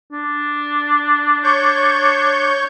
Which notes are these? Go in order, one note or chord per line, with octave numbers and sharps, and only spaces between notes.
D4
C#5 C#6 G6